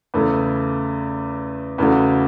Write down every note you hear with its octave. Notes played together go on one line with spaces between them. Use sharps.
E2 C#3 A3
E2 C#3 A3 F#4